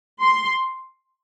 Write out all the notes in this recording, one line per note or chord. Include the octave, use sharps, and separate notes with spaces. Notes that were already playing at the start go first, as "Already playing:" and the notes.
C6